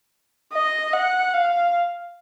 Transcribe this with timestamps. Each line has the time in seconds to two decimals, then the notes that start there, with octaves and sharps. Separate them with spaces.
0.53 D#5
0.93 F#5
1.34 F5